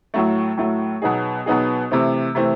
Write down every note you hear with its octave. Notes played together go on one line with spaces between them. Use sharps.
A2 F#3 A3
A2 F#3 A3
B2 F#3 B3 D#4 G#4
B2 F#3 B3 D#4 G#4
C3 E3 A3 C4
C3 E3 A3 C4